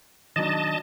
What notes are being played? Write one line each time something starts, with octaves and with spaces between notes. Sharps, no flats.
D#3 F#3 D4 D#5 A5